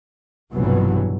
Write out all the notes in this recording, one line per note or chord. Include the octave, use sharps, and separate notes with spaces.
F1 A#1 G2 B2 E3 F#3